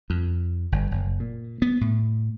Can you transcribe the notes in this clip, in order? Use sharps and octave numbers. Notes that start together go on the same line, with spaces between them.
F2
G1
F#1
A#2
B3
A2